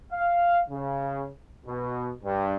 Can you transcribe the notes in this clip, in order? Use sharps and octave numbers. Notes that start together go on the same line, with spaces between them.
F5
C#3
B2
G2